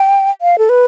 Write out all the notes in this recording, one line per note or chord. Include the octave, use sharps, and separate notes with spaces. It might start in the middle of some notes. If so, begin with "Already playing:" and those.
Already playing: G5
F5
A4
B4